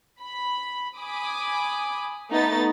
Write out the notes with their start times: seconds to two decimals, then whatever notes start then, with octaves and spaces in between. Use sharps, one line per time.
0.21 B5
0.95 G#5 B5 D6 D#6
2.30 A3 B3 D#4 B4 A6